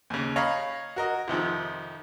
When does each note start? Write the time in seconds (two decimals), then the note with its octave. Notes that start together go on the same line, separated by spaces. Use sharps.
0.10 D#2 C#3
0.36 C#5 D#5 F5 A#5 B5
0.96 F#4 A#4 D#5
1.28 F2 C3 D#3 F3